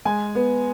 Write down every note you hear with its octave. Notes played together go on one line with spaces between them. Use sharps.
G#3 G#5
B3